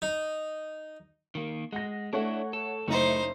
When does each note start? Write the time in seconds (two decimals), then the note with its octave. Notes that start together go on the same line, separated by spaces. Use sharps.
0.02 D#4
1.35 D#3 A#3
1.73 G#3 F#5 A#6
2.13 A3 D4 E4 C#5 F#5
2.53 A4
2.88 F#1 A3 D#4 E4 C5